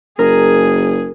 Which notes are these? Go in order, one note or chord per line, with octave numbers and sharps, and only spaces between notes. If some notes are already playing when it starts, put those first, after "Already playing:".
F#1 G#4 A#4